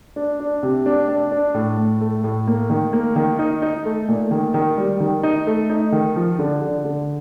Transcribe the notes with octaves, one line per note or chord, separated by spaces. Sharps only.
D4
D4
C3
D4
D4
D4
A2
A2
A3
A2
A#3
D#3
A#3
D#3
D#4
D#4
A3
A#2
D#3
D#3
G3
D#3
D#4
A3
D#4
D#3
F3
D3
D3
D3